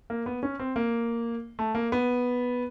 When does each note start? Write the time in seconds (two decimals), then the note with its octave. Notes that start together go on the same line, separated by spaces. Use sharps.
0.10 A#3
0.26 B3
0.43 C#4
0.59 C4
0.76 A#3
1.59 A3
1.75 A#3
1.92 B3